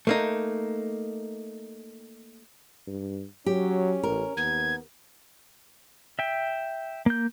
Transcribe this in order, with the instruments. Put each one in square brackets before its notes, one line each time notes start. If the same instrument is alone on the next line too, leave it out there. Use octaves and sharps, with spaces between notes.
[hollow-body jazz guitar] A3 A#3 D#4
[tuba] G2
[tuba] F#3 [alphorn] C#4 [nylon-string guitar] G4
[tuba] A1 [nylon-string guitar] A#4
[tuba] D#2 [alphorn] B3 [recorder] G#6
[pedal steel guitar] E5 G5
A#3 G6